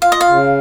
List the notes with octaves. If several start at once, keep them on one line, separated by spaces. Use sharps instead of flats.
F4 F5
D#5
F5
C#3